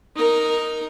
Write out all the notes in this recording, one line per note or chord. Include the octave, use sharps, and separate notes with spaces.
D#4 A#4